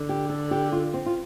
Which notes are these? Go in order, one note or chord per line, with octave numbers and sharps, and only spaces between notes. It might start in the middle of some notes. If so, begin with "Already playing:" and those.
Already playing: D3
G4
A4
G4
F4
C4
F4